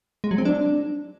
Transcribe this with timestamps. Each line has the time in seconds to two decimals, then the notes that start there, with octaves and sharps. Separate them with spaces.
0.24 G#3
0.31 F#3
0.38 C4
0.45 D4